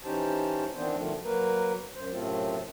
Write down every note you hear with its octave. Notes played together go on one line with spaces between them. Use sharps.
E3 C#4 D#4 G4 C5 A5
D#3 E3 B3 C4 D4 C5
B2 D3 D#3 F3 A3
F#3 A#3 A#4 B4
F#2 C5
F#2 A2 C3 A3 C4 F4